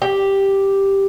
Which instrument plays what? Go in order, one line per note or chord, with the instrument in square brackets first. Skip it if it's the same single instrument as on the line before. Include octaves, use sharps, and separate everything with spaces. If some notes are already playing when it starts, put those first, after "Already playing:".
[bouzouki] G4